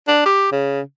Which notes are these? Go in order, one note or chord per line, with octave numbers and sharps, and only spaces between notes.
D4
G4
C#3